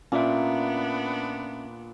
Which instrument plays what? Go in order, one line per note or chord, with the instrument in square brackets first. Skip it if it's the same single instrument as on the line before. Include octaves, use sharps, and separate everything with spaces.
[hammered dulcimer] A#2 [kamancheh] B3 D4 [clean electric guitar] C#4 E5